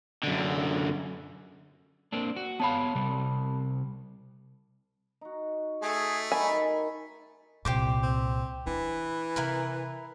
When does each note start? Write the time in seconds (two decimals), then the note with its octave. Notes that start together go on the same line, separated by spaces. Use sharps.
0.23 F#2 D3
2.12 A#3 C4 D4
2.36 F#4
2.60 B3 C#5 F5 A5 B5
2.95 C3 G3
5.21 D#4 F#4
5.83 A3 G#4
6.32 D#3 D#4 G#5 B5
7.65 C2 A#2 G4 C5 D6
8.03 C4
8.67 E3 D4
9.36 C3 E4 A#4 B4